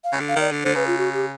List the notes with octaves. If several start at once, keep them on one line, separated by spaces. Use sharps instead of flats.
F5
C#3
D3
F5
D#3 D5
D3
D3 C5
C#3 B4
F4
F#4
G4